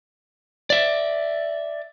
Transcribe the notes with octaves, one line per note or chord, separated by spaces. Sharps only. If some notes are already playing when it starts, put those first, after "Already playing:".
D5 E5